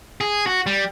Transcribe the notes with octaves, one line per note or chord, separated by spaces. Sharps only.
G#4
F#4
G3